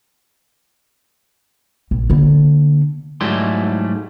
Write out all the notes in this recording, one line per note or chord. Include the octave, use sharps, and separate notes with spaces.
A#1
D3 A#3
G#2 F#3 G3 A3 E4 C6